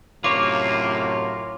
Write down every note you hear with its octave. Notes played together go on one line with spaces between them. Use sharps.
F#2 A2 C3 A#3 F4 C#5 D6